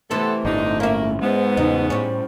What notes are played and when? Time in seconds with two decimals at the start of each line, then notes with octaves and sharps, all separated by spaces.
0.11 C3 E3 A3 B3 C4 A4
0.45 G1 A2 D4 D#4
0.80 A#3 C#4 E4
1.22 G#2 G#3 B3 C5
1.57 E2 C#3 D#4
1.90 A2 G3 C#4 C5